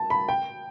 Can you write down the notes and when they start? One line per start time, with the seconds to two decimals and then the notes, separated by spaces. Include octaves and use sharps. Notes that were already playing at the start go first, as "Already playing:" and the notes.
Already playing: A5
0.10 B5
0.29 G5